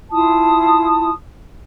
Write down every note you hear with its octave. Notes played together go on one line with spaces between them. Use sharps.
E4 F4 A5 D#6